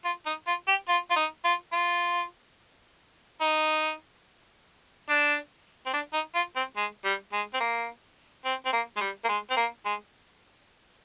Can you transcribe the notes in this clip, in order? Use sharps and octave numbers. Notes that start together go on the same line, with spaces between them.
F4
D#4
F4
G4
F4
F4
D#4
F4
F4
D#4
D4
C4
D4
D#4
F4
C4
G#3
G3
G#3
C4
A#3
C4
C4
A#3
G#3
G3
A#3
G#3
C4
A#3
G#3